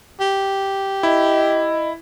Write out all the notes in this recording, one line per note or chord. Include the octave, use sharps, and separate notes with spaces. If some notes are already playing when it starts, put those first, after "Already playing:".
G4
E4 D#5